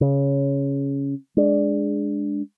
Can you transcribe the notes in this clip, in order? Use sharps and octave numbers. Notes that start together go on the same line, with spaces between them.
C#3
G#3 D4